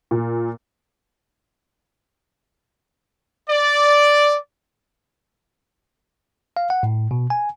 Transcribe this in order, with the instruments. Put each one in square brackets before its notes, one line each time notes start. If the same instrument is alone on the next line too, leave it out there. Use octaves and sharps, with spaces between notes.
[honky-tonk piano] A#2
[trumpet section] D5
[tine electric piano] F5
F#5
A2
B2
G#5